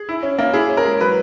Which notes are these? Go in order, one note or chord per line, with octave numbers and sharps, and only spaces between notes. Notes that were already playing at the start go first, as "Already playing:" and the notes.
Already playing: G#4
E4
C#4
A#3
E4 G#4
C#4
A#4
G#3
F#3 B4